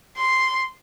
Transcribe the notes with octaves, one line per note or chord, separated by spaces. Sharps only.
C6